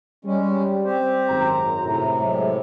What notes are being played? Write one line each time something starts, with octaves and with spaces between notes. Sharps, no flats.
G3 G#3 C#4
C4 G4 C5
G#1 F#2 A#5
A2 C3
F#3 G#3